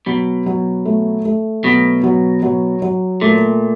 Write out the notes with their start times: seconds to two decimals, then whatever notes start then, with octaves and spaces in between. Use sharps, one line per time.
0.06 B2 F#3
0.46 F#3
0.85 A3
1.25 A3
1.64 B2 F#3
2.03 F#3
2.43 F#3
2.82 F#3
3.21 A#2 A3